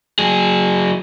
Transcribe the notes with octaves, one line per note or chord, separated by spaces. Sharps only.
F#3 G#4